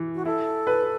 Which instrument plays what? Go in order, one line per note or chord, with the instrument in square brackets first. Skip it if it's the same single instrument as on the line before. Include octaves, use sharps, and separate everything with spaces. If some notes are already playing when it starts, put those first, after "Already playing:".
Already playing: [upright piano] E3
[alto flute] F#4
[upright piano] E4 [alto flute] A4
[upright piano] B4